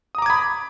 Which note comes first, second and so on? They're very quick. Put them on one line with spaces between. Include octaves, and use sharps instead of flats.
D#6 A#5 D6 G#6 B5